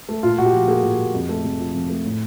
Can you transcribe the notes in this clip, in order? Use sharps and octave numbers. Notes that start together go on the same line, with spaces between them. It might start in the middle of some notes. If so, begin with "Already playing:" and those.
A3
A#2 F4
A#2 F#4
G4
F3
A#3 G#4
A#2
A#2
F2
A3
C3
F3
F2
A3
A2